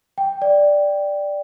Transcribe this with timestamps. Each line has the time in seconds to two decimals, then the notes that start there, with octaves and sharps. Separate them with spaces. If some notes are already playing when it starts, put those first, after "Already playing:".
0.18 G5
0.42 D5